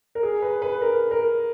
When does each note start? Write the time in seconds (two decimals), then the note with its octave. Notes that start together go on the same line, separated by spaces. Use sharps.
0.15 A#4
0.23 G#4
0.42 B4
0.62 B4
0.81 A#4
1.11 A#4